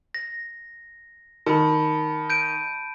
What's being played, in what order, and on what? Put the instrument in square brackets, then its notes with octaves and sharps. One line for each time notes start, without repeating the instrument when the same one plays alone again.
[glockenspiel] A#6
[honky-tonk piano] D#3 [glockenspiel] A5 B5
[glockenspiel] G6 D7 D#7